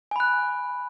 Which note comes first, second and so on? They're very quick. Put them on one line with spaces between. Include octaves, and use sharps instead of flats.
G#5 B5 F#6